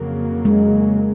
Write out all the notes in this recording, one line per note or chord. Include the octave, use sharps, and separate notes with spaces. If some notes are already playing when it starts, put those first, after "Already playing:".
Already playing: F2 C#3 F#3 A#3
G#3